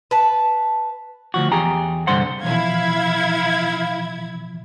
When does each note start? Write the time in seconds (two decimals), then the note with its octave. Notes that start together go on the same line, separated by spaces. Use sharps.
0.11 B4 A5
1.34 D2 F3 F#4
1.52 E2 G4 G#4 A#5
2.07 C2 G2 D3 C5 F#5
2.43 B2 E3 F3 E4 F5 G#6